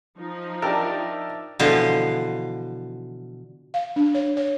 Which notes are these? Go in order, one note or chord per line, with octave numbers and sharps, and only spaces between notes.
F3 D#4
D4 G4 A#4 D#5 E5 A5
B2 D3 E3 F3 C5
F5
D4
C#5
C#5